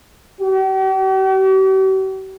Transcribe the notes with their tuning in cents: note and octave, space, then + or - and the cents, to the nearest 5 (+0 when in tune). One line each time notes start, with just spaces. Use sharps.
G4 -45